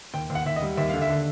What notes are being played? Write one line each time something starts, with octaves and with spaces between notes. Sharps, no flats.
D#2 G5
D#2
F#5
D#2 E5
D#5
G3
D#2 E5
D3 F5
E5
D3